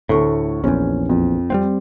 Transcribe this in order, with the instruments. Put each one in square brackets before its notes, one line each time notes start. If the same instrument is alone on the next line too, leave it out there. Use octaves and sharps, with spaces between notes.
[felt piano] D2 A4 C#6 [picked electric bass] A2
[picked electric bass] A#1 E2 [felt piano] C#4
[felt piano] F2
[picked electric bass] G3 B3 C4